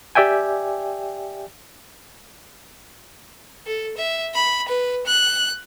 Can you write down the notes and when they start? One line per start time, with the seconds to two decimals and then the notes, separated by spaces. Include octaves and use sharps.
0.15 G4 D5 E5 G5 G#5
3.67 A4
3.97 E5
4.35 B5
4.68 B4
5.07 F#6